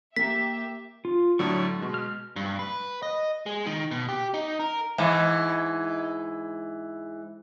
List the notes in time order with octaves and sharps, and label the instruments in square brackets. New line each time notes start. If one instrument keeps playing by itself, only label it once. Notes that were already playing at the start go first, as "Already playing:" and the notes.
[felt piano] A#3 A#5 [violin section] G4 E5 [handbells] B6
[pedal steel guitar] F4
[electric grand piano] A2 D3 F#3 [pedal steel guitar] C#6
[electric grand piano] B2 G#3
[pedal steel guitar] F6
[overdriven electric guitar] G2
B4
D#5
G#3
D#3
B2
G4
D#4
A#4
[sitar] G#2 E3